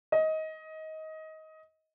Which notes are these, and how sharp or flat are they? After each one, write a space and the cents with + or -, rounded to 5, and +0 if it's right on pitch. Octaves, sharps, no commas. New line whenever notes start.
D#5 +20